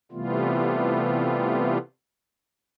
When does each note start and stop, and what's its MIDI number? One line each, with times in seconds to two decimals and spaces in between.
0.12 1.78 48
0.12 1.78 52
0.12 1.78 55
0.12 1.78 57
0.12 1.78 59
0.12 1.78 65